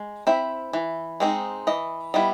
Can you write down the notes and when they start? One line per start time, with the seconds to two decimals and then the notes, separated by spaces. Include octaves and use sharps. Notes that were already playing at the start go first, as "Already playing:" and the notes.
Already playing: G#3
0.27 C4 E4 E5
0.73 E3
1.20 G#3 C4 D#4
1.67 E3 D#5
2.14 G3 B3 E4 D#5